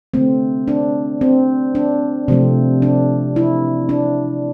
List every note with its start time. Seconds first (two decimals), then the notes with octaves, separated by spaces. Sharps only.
0.14 D3 A3 C4
0.68 D4
1.21 C4
1.75 D4
2.28 C3 F3 A3 C4
2.82 D4
3.36 E4
3.89 D4